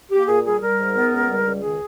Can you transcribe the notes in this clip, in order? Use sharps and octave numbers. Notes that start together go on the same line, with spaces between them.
A#3 G4
A#2 G#4
G3 G#4
G3 A#4
G#2
B3
C#2
G3
C#2
D#3 G#4